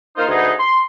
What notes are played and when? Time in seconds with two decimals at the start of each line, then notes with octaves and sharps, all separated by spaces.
0.17 A#3 D#4 F4 C5
0.29 D2 B3 D#4 G#4
0.58 C6